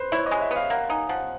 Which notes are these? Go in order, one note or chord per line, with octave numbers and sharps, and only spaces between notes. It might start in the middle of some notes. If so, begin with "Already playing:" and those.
Already playing: B4 C5
E4 C#5
D#5
G#3
E5
B3
F5
A#3 F#5
D#4 G#5
F3 F#5